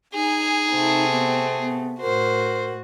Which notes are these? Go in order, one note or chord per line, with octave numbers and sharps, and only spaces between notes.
D#4 G#4 G#5
C3 A3 C4
B3
B3
A2 F#4 A#4 C5